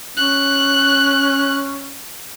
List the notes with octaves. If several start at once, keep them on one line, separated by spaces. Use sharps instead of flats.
C#4 F#6